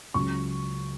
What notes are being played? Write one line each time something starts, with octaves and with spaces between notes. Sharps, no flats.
C#2 C#3 F#3 C#4 C#6